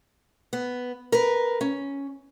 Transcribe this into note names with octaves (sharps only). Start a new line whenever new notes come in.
B3
A#4 B4
C#4